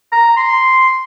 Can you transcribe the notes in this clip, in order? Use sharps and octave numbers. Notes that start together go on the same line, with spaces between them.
A#5
C6